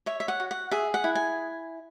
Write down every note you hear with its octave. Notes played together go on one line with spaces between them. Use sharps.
C#5 E5
E5
F#5
F#4
F#5
G#4 E5
F#5
E4
G#5